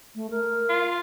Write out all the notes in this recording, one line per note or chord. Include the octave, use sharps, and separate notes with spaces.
A3
A#4
F4